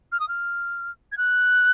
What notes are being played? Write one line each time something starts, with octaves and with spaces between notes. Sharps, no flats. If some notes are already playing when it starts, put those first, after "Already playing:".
F6
D#6
F6
G#6
F#6